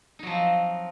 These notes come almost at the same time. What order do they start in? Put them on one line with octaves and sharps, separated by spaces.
D#4 F#3 F3 C4